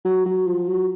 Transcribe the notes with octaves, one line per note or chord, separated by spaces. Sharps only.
F#3
F#3
F3
F#3